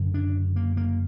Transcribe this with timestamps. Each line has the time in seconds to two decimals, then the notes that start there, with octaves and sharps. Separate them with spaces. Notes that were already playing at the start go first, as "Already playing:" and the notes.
Already playing: F#1 F#2 D3
0.14 D4
0.56 A#3
0.77 A#3